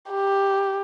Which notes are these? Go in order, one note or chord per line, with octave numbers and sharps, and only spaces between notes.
G4